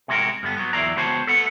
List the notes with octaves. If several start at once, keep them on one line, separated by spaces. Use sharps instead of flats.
C3 G#3 F#4 A#4
G2 D3 B3
F#3 B3
E2 F#3 E4 F4 D5 A#5
C#2 B3 F#4 C5 C#5 A5
A4 B4 F#5